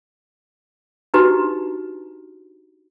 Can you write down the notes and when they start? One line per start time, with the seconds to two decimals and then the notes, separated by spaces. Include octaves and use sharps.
1.14 D4 D#4 F#4 G4 B4 A#5